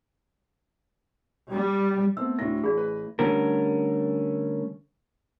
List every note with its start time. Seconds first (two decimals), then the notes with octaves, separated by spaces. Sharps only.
1.49 G3
2.17 A3 B3 C4 E6
2.39 D2 A2 D4 A#6
2.64 A1 G#4 D5 B5
2.77 B4
3.19 D3 G3 A3 C#4 A#4